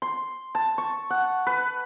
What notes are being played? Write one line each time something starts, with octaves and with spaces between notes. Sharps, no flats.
C6
A5
C#6
F#5
B4